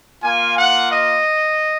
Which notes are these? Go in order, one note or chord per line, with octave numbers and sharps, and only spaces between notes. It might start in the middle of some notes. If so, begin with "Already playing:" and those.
A#3 F4 G#5
F#5
D#5